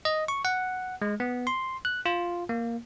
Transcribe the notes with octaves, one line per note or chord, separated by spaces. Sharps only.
D#5
C#6
F#5
G#3
B3
C6
F#6
F4
A#3